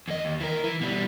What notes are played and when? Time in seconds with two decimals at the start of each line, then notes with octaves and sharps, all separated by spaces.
0.08 E2 D#5
0.25 D#2
0.40 E3 A#4
0.64 E3
0.81 B2 G3